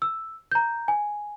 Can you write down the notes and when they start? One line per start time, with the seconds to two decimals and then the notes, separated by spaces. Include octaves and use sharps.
0.02 E6
0.52 A#5 G6
0.88 G#5